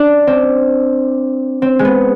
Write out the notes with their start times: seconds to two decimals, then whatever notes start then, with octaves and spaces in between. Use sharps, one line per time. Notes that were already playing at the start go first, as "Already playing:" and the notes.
Already playing: D4
0.27 C4
1.62 C4
1.79 G#3
1.85 B3